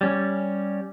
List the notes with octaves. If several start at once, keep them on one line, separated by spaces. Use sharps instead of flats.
G3 C#4